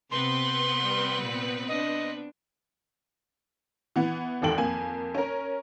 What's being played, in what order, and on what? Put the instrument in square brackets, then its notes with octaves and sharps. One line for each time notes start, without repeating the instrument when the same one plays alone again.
[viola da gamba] C3 [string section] B3 C4 B4 [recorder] C6
[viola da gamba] G3
A#2
[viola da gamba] D4 [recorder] D#5
[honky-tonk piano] E3 B3
G#1 E2 G#2 A4 G5 F#7
F2 A#3 G#5
C#4 A#4